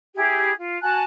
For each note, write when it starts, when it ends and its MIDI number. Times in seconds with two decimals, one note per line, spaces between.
0.15 0.51 64
0.15 0.51 67
0.15 0.51 68
0.58 0.78 65
0.82 1.04 66
0.82 1.04 80
0.82 1.04 81
0.82 1.04 90